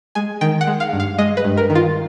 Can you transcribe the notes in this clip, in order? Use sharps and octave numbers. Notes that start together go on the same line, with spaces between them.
G#3 G#5
D#3 G5
F#5
G#3
F5
G2
F5
G#3 D#5
B4
G2
A#4
D#3
F4